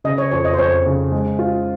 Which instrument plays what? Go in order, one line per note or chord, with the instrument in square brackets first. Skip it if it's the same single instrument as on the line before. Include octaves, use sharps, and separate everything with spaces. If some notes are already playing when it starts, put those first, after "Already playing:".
[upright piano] C#3 [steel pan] D#5
[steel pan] C#5
[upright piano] F2 [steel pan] C#5
[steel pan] D#5
C5
[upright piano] F2 [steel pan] C#5
[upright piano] C#3
G#3
F4